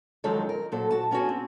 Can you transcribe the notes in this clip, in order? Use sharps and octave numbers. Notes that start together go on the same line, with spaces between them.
F#2 D#3 F3 F#3 G#3 A4
A#4
A#2 F#3 A4 C5
F#4 A5
B3 C#4 F4 F#4 G#4
C4